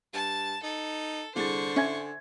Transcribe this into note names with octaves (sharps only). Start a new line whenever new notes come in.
G2 A5
D#4 A4
C2 D3 G#4 C5 C#6 A6
C#4 E5 G#5 G#6